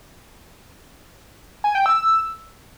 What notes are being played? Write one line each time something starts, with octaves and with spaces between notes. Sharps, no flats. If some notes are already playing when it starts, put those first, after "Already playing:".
G#5
G5
E6